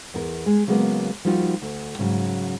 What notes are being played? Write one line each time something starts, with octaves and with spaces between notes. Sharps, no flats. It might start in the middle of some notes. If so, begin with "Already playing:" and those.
E2 A#4
G#3
C#3 F#3 G#3 A#3 B3
F3 G3 A#3 D#4 F4 F#4
D2
G#2 C#3 E3 F#3